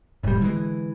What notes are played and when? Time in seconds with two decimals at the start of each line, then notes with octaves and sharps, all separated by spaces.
0.23 E1 A2 G3
0.41 D3 E3 G#3